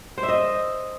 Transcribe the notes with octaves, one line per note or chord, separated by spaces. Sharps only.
C5
E5
D#5